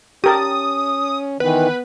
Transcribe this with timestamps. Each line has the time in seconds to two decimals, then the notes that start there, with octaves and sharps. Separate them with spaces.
0.24 C#4 G4 A#4 A5 D#6
1.40 D#3 E3 B3 B4